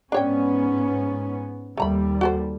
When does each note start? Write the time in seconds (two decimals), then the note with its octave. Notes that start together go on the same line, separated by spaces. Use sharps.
0.12 G#2 B3 C#4 D4 C#5 G5
1.77 D#2 G3 A3 A#5 B5
2.21 F#4 A4 C5